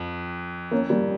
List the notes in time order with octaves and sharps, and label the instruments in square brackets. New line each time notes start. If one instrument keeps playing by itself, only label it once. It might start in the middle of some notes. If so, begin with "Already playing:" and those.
Already playing: [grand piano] F2
[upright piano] A#3 C#4
G3 A#3